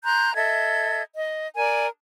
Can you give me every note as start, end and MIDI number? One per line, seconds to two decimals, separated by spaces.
0.04 0.33 82
0.04 0.33 84
0.04 0.33 90
0.04 0.33 91
0.34 1.03 69
0.34 1.03 75
0.34 1.03 76
0.34 1.03 92
1.13 1.45 75
1.55 1.87 70
1.55 1.87 74
1.55 1.87 80